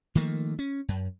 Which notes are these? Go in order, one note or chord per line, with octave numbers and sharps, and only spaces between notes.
D#3 F3 A3 A#3
C#4
F#2